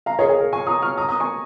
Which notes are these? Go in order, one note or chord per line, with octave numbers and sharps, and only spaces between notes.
F5 A#5
G#4 C#5
G#4 C#5
A#4
G#5 C#6
A#5 D#6
C#6 F6
A#5 D#6
A#5 D#6
G#5 C#6